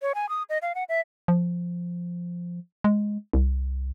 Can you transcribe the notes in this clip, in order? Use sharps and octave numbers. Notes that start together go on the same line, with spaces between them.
C#5
G#5
D#6
D#5
F5
F#5
E5
F3
G#3
C2